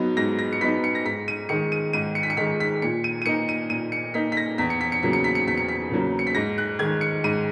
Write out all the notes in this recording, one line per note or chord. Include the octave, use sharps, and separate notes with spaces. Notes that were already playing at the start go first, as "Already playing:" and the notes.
Already playing: G#2 F#3 B3 D#4
G#2 A#6
A#6
C#7
F#3 B3 D#4 B6
C#7
A#6
G#2 B6
D#7
D#3 G#3 C#7
D#7
G#2 D#7
C#7
B6
C#7
D#3 G#3 B6
B6
A#2 C#7
D#7
D#7
A#3 D#4 C#7
D#7
A#2 D#7
C#7
A#3 D#4 B6
B6
A#6
E2 B6
C#7
B6
C#7
C#3 F#3 A#3 B6
C#7
B6
C#7
E2 B6
C#7
B6
C#3 F#3 A#3
C#7
B6
G#2 A#6
F#6
D#3 G#3 G#6
C#7
G#2 D#7